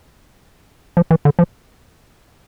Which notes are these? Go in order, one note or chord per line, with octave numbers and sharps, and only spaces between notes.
F3
E3
D3
F3